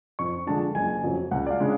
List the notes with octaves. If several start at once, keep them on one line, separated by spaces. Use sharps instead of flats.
F2 C#6
D3 F3 G#3 D4 A5
F#1 G#5
F2 C#3 F#3
C#2 F#5
D5
F5
C#3 G#3 D4